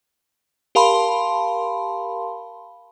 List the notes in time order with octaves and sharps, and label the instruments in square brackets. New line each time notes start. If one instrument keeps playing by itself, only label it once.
[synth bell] G4 A#4 F5 A5 B5 C6